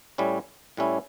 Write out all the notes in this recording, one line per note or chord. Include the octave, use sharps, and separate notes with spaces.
A2 G3 C#4 E4
A2 G3 C#4 E4